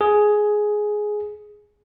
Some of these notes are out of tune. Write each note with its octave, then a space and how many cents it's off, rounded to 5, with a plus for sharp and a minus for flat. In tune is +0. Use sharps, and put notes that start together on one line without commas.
G#4 +10